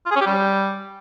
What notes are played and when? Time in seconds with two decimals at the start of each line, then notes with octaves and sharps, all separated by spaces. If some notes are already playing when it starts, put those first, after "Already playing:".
0.06 F4
0.11 G#4
0.16 C#4
0.21 G4
0.26 G3